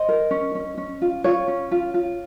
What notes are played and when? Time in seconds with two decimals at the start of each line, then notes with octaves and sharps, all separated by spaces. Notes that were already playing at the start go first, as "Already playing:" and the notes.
Already playing: C5 D#5
0.09 A#4
0.31 C#4
0.55 C#4
0.78 C#4
1.02 F4
1.24 F4 C#5
1.48 C#4
1.71 F4
1.94 F4